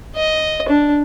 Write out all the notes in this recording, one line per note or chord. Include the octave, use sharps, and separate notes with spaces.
D#5
D4